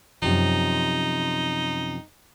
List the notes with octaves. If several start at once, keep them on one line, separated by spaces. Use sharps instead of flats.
F#2 C3 F3 D#4